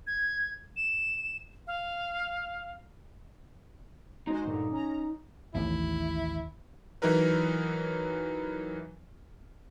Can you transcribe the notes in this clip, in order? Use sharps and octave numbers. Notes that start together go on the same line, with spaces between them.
G#6
E7
F5
G#3 D#4 F#4 C5 D#5
G2 A#2 D3
C#4 A#5
A1 D#2 A2 E4
E3 F#3 D#4 E4 A#4 B4